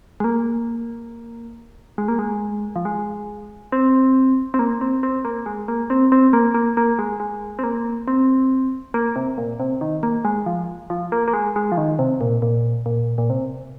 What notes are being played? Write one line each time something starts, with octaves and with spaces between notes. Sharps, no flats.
G#3
A#3
G#3
A#3
G#3
F3
G#3
C4
C4
A#3
C4
C4
A#3
G#3
A#3
C4
C4
A#3
A#3
A#3
G#3
G#3
C4
A#3
C4
A#3
C3
A#2
C3
D#3
A#3
G#3
F3
F3
A#3
A#3
G#3
G#3
F3
D#3
C3
A#2
A#2
A#2
A#2
C3